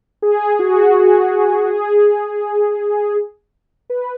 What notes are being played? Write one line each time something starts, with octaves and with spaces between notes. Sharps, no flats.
G#4
F#4
F#4
G#4
B4